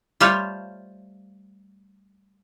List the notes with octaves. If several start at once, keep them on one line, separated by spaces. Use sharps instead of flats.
G3 A3 F4 C5 C#5 F5